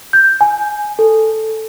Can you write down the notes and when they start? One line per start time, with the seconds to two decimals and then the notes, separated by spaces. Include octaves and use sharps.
0.13 G6
0.41 G#5
0.99 A4